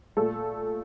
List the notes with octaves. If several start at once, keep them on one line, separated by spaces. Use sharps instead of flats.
A#2 A3 A4